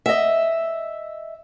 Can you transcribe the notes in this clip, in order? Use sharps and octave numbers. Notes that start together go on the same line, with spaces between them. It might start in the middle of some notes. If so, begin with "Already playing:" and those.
D#5 E5